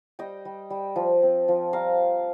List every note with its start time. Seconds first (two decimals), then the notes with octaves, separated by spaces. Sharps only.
0.19 G3 D#5 G5
0.45 G3
0.70 G3
0.96 F3
1.23 C4
1.48 F3
1.73 G3 F5 A#5